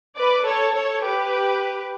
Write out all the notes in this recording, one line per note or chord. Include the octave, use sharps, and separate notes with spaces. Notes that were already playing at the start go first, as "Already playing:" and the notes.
B4 D5
A4 C#5
A4 C#5
G4 B4